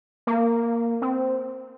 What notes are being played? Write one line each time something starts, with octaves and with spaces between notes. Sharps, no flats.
A#3
C4